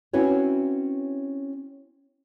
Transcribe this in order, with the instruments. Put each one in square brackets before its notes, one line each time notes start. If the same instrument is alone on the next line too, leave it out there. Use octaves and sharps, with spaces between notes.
[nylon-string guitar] C4 C#4 E4 F#4 B4 C#5